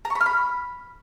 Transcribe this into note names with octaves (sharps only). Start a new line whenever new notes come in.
A#5
C#6
B5
F6
B5